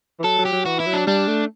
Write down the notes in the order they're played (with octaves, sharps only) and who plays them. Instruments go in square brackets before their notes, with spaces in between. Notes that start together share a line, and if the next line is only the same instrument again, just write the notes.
[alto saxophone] E3
[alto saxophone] F#3 [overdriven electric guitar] A4
[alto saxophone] F#3
[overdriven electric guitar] G4
[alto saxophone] F#3
[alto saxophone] E3 [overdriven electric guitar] F#4
[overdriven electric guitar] E4
[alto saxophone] F#3
[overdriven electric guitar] D4
[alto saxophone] G3 [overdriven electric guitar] D4
[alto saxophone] A3